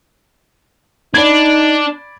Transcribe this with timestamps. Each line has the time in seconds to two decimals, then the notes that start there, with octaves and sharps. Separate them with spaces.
1.14 D4 D#4 D5 B5 G#6